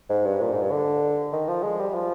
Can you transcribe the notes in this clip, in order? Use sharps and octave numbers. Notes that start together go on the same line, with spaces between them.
G#2
G2
A#2
G#2
G2
D3
D#3
F3
G#3
G3
F3